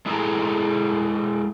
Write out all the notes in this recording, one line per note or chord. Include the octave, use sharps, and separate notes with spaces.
G#3 E4 G#4 A4 A5 A#5